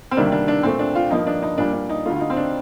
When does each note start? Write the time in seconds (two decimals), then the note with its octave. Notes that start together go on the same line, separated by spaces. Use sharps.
0.11 C4
0.17 D2 C3 D#3 G3 A#3 D4
0.32 D4
0.48 D4
0.63 A#2 A3 C4
0.79 D4
0.95 F4
1.10 G2 F3 A#3 D#4
1.27 D4
1.43 D#4
1.58 A#2 G3 A#3 D4
1.73 D4
1.89 D#4
2.05 D2 D3 A3 F4
2.16 F4
2.20 D#4
2.30 C4
2.37 D4